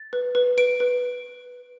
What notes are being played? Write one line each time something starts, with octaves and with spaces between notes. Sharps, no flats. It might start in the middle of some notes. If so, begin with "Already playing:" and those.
Already playing: A6
B4
B4
B4 D7
B4